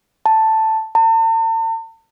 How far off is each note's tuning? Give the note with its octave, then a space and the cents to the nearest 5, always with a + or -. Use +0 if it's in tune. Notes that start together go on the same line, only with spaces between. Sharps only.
A5 +5
A5 +45